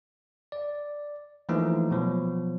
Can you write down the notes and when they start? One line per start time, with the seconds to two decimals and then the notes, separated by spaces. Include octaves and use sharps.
0.52 D5
1.49 E3 F3 A3 A#3 D#4
1.91 B2 F3 F#3